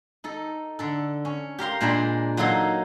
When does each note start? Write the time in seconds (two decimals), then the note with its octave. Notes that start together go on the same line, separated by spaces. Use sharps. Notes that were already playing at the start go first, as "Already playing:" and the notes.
0.24 D#4 A4
0.79 D3 A4
1.25 C#4
1.58 G4 A#4 F5 C6
1.81 A#2 G#3 D4 A#4 C5 B5
2.37 F#3 A#3 D#4 A4 C6